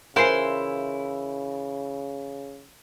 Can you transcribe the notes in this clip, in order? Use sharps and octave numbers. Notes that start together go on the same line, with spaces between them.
C#3 E3 E4 F4 A#4 C5 G#5 C6